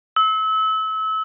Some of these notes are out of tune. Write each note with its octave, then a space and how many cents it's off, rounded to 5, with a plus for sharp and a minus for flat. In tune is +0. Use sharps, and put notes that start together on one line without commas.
E6 -30